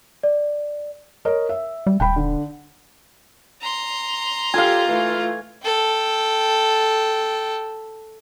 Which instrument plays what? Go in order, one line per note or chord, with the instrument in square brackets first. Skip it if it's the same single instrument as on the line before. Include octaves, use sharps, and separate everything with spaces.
[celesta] D5
[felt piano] A#4 C#5 D#5
E5
[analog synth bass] G3
[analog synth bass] D#1 [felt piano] G5 B5
[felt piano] D3
[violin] A#5 C6
[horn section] F4 [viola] G4 A4 [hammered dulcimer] F5 G#5
[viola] E3 A3
[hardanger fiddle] A4 G5